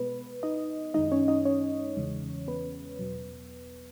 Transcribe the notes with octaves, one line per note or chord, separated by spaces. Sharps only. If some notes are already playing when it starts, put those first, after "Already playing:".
Already playing: B2 G#3 B3 B4
D#4 D#5
F#2 D#3 G#3 D#4 D#5
C#4 C#5
D#4 D#5
C#4 C#5
E2 C#3 E3 G#3
B3 B4
E2 B2 F#3